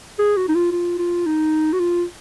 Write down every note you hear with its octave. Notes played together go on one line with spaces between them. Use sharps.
G#4
F#4
D#4
F4
F4
F4
D#4
F#4
F4